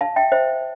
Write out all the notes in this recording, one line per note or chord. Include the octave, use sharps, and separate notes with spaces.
F5 A5
E5 G5
C5 E5